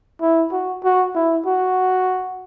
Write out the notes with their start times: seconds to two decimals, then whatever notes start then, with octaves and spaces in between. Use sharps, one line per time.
0.21 E4
0.52 F#4
0.84 F#4
1.15 E4
1.46 F#4